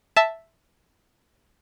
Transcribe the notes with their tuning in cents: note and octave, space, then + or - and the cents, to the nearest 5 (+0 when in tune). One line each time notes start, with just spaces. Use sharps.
E5 +0 A5 +0